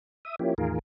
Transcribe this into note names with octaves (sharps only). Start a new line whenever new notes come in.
E5 D#6
F3 A#3 C#4 E4 G4
E2 A2 D#3 F4 G#4 A#4